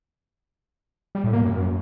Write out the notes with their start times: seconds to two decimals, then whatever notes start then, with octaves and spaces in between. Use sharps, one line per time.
1.15 G3
1.24 A2
1.33 A#3
1.42 F#2